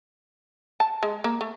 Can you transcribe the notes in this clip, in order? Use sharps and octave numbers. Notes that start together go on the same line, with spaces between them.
A5
G#3
A#3
A3